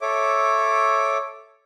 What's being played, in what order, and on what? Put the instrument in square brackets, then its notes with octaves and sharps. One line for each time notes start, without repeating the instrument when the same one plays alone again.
[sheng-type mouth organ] A4 C#5 E5 D6